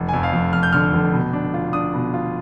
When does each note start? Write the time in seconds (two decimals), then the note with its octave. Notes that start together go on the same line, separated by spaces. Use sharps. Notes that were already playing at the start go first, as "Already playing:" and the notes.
Already playing: F1
0.09 G#5
0.14 F2
0.23 F5
0.33 F2
0.53 F2 F6
0.63 G6
0.73 D3 F6
0.93 F1
1.13 B2
1.33 D4
1.54 F4
1.73 D4 D#6
1.94 B2
2.14 F4